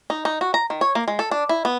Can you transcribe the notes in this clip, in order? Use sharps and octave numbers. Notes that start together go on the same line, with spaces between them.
D#4
D#4
F#4
A#5
D#3
C#5
A#3
G#3
A4
D4
E4
B3